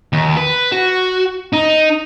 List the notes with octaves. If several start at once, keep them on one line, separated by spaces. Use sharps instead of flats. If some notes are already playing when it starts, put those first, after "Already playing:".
D#2
B4
F#4
D#4